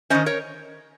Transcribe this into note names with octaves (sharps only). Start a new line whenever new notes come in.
D#3 G3 C#4 C5 D#5
A#4 C#5